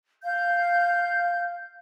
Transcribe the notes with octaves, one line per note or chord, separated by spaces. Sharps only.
F5 G6